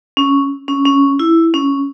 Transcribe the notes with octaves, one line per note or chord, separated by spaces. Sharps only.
C#4
C#4
C#4
E4
C#4